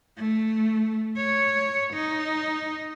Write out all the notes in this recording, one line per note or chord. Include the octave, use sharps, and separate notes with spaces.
A3
C#5
D#4